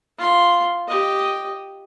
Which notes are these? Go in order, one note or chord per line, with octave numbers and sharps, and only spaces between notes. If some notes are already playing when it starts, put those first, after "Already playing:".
F4 C6
G4 D#5